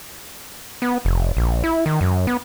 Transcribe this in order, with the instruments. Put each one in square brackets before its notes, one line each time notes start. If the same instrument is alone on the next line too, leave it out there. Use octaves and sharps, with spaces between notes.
[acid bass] B3
F1
A#1
E4
D#3
F#2
B3